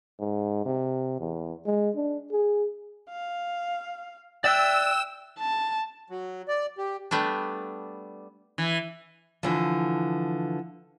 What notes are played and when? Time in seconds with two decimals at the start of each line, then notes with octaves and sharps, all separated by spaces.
0.20 G#2
0.66 C3
1.20 E2
1.66 G#3
1.95 D4
2.32 G#4
3.10 F5
4.44 D5 E5 G5 E6 F#6
5.39 A5
6.10 F#3
6.48 D5
6.78 G4
7.11 G3 A3 B3 D4
8.58 E3
9.43 D3 E3 F3